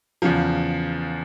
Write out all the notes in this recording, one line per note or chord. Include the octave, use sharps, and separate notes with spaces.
E2 C#3 F3